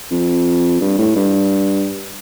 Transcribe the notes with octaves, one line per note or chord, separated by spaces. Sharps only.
F2
G2
A2
G2